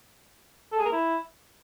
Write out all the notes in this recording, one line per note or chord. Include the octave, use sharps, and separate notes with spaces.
A4
G#4
A#4
E4